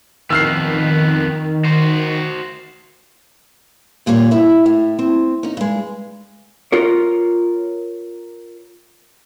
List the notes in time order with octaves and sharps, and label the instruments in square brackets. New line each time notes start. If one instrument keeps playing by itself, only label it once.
[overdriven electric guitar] F2 B3 [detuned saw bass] D#3 [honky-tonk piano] E6 F6 C7
[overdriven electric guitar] F#4 C5
[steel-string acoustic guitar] D#2 A#2 G3 A4 C#5
E4 E5
A2
C4
C#4 D#4
G2 G#3
[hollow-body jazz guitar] F4 A#4 C#5